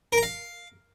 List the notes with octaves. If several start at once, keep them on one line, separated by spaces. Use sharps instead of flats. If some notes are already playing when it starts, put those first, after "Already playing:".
A#4
A#5
F5